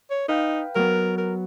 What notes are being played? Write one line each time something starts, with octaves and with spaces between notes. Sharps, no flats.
C#5
D#4 B4 F5 G5
F#3 B3 A#4
A#4